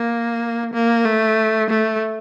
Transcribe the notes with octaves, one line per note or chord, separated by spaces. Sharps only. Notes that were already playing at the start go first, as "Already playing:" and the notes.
Already playing: A#3
A#3
A3
A3